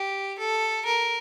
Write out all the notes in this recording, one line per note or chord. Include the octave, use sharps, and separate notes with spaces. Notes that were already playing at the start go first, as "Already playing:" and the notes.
Already playing: G4
A4
A#4